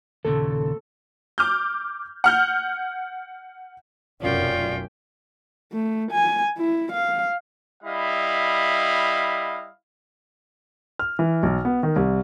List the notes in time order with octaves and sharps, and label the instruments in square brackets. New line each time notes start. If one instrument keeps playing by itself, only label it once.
[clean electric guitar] D#2 A#2 C#3 [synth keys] A4
[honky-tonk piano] D6 F6 G6
F#5 F6 G6
[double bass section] F1 B1 F#2 [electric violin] C#4 G5 [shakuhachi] F4 [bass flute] D5
[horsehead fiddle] A3
G#5
E4
F5
[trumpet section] G3 E4 D#5 F5
[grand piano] F6
E3
B1
B3
D#3
C2